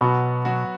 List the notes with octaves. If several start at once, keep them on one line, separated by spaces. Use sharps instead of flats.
B2 F#3 B3 F#4
F#3 B3 F#4